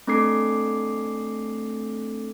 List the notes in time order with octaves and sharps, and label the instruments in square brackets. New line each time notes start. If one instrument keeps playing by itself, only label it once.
[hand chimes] A3 C4 D4 A4 D6 C7